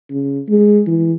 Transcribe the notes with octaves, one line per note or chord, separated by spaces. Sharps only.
C#3
G#3
E3